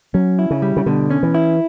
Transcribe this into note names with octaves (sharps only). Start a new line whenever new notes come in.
F#3 C#4
E4
C#3
G3
C#3
B2 D3
C#4
E3
E4